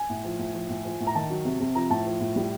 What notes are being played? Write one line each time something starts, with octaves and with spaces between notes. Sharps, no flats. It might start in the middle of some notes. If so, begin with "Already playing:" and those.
Already playing: G#5
A2
F3
A2
F3
A2
F3
A2
A#5
D#3 A5
F#3
C3
C3
F3 A#5
A2 A5
F3
A2
G3